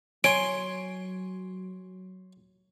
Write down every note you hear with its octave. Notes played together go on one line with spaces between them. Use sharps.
F#3 C#5 G#5 C6 D7